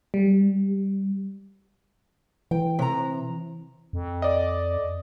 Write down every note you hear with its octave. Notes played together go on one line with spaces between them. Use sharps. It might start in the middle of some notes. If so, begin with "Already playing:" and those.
G3
E3 G5
C3 A#5
F2
D5 D#5